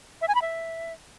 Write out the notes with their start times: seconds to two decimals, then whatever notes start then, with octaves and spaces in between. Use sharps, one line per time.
0.21 E5
0.28 G#5
0.35 B5
0.42 E5